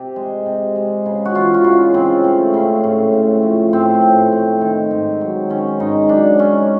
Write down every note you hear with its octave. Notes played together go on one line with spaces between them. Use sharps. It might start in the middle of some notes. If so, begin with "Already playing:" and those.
Already playing: C3 G4
G#3
C3
G#3
C#3
F#4
E3 F4
F#4
C#3 F4
C#3 C4
A3
C#3
A2
A3
F3
A2 C4
A2
A3
D#3
G#2
F#3
D#3 C#4
G#2 D#4
F#3 D4
G#3 C#4